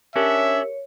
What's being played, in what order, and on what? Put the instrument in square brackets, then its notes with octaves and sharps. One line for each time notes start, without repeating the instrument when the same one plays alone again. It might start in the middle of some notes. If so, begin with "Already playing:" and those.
[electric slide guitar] C#4 D4 [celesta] G4 A#4 [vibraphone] C#5 [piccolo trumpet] E5